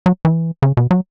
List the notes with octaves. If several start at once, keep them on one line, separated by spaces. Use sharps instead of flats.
F#3
E3
C#3
B2
F#3